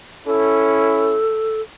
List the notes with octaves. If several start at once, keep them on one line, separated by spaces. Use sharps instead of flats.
C#4 E4 A4